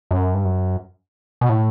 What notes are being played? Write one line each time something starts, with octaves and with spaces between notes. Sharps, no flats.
F#2
G2
F#2
B2
A2